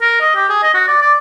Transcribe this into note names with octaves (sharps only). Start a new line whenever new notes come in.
A#4
D#5
G4
G#4
D#5
F#4
D5
D5